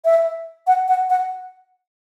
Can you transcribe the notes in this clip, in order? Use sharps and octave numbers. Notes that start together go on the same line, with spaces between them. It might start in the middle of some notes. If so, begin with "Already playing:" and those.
E5
F#5
F#5
F#5